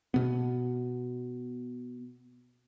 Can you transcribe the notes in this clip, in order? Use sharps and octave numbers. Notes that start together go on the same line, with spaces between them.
B2 B3